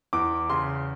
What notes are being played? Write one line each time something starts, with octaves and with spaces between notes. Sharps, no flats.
E2 D6
C#3 C6